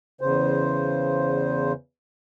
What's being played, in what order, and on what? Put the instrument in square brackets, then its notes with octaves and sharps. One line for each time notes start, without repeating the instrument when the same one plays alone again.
[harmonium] E2 C#3 C5